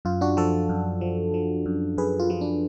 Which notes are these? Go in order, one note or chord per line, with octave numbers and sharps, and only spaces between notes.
F#2 F4
D4 F#4
F3 F#4 A4
F#2
F3
F3
F#2
F#2 G#4 B4
F4
F3 F4
D4